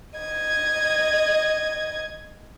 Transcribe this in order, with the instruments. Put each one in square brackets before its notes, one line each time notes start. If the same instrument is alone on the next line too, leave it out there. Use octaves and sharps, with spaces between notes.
[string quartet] D#5 G#6